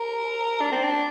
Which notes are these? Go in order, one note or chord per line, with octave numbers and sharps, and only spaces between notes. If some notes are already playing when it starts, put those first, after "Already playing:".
Already playing: A#4
D4
C4
D4